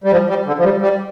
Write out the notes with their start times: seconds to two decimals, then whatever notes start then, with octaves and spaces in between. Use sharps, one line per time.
0.04 G3
0.12 F3
0.29 G3
0.47 D3
0.59 F3
0.64 G3
0.82 G3